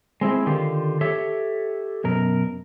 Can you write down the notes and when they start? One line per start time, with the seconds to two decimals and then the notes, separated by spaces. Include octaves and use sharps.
0.21 G#3 C4 E4 G#4
0.46 D3 D#3 F4 G4
1.01 G4 A4 C#5 E5
2.04 F#2 B2 A#4